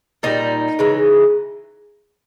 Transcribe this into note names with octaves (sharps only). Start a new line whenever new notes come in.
A#2 G3 D#4
C#3 E3 G#3